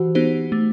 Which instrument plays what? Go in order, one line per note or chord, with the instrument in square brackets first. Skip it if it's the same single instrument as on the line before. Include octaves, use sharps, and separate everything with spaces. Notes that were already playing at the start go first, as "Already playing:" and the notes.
Already playing: [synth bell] E3 G4 C5 [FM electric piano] F#4
[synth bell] B3 D#4 G4 C5
A3